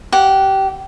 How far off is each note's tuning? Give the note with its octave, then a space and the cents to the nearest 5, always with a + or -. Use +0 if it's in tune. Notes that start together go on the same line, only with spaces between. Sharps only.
G4 -20 F#5 -10